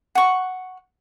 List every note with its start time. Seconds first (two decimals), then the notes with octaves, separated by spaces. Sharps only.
0.15 F#5 C#6